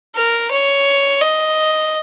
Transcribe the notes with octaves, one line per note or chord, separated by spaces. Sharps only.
A#4
C#5
D#5